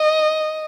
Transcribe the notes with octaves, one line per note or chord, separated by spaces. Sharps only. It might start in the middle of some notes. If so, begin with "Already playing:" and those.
Already playing: D#5